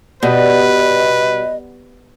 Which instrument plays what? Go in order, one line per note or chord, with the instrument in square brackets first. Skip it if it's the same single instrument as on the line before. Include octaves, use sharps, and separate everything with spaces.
[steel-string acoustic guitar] B2 [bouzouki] G3 [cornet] B4 [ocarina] D#5